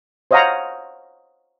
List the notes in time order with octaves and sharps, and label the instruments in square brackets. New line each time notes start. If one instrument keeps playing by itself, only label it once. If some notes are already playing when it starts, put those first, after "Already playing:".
[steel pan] C5 C#5 D#5 F5 F#5 A#5